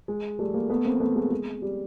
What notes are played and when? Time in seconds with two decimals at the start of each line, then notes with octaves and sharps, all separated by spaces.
0.08 G#3
0.39 G3 A3
0.54 G#3 A#3
0.70 A3 B3
0.85 A#3 C4
1.00 A3 B3
1.16 G#3 A#3
1.31 G#3
1.62 G3